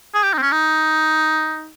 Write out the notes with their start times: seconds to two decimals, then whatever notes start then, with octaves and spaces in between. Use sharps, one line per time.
0.15 G#4
0.23 G4
0.34 D#4
0.38 C4
0.43 C#4
0.52 D#4